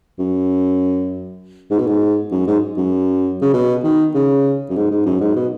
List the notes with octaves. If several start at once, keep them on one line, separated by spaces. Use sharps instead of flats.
F#2
G#2
B2
G#2
F#2
G#2
F#2
C#3
B2
D#3
C#3
F#2
G#2
G#2
F#2
G#2
B2